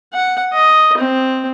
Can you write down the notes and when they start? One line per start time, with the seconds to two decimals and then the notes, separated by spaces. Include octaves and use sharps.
0.13 F#5
0.53 D#5
0.97 C4